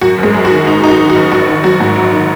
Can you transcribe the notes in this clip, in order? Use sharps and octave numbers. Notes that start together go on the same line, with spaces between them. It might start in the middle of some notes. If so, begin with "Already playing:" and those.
F#2 F#4
F#1
G#3 G#4
F#2
F#4
D#3
F#1 D#4
D#3 D#4
F#4
D#3
F#4
F#1
A#1 F#4
D#3
F#3 F#4
G#2
A#1
D#3